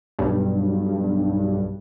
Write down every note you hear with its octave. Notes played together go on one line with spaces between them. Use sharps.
B1 G2